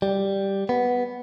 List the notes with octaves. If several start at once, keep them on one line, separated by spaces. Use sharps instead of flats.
G3
B3